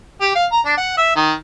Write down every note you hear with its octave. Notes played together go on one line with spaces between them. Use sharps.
G4
F5
A#5
D4
F#5
E5
D#3